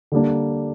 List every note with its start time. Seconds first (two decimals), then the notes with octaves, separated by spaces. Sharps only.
0.12 D3 G3 A#3 D4